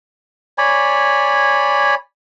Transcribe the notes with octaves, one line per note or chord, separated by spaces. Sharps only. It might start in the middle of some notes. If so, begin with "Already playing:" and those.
C#5 D5 G#5 B5